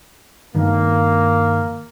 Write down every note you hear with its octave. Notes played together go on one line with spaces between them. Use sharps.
G2 D#3 A#3